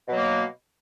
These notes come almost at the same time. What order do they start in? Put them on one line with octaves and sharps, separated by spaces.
B2 F#3 A#3